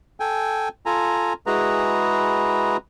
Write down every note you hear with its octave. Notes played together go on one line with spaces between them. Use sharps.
A4 G5 G#5
F4 A4 G#5 A#5
G#3 E4 F#4 G#4 B4 A#5